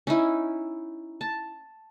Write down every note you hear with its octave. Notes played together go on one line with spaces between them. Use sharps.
C#4 D#4 E4
A5